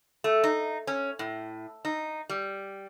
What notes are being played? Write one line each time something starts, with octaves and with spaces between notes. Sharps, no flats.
A3
D#4
C#4
A2
D#4
G3